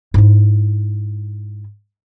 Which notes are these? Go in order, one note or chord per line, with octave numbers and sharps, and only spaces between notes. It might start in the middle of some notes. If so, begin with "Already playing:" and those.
G#2 E4